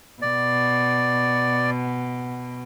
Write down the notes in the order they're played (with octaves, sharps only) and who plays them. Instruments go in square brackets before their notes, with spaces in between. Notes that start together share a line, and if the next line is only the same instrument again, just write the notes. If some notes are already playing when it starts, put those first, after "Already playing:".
[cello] B2 [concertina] D5